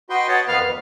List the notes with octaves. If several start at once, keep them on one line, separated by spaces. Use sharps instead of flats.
F#4 B4 D#5 G5 C6
C#5 D#5 F#5 A5
F2 D#3 B3 B4 F5 F6
D2